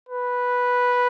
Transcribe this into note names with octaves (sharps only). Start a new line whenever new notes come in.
B4